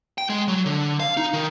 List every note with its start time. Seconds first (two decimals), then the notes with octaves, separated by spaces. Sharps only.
0.18 G5
0.29 G#3
0.48 F#3
0.66 D3
1.00 F5
1.17 D#4
1.33 D#3